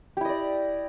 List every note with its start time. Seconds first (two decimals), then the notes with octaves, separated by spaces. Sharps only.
0.17 G4
0.21 E4
0.25 D#5
0.29 D5